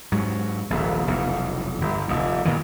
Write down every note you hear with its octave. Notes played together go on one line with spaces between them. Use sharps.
G#2 F#3
D#1 A#1
F1 B1 E2
G1
F1 D#2
A#2 D#3 E3